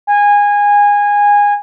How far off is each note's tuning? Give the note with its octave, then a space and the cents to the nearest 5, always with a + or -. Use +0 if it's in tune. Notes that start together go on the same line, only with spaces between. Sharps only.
G#5 -20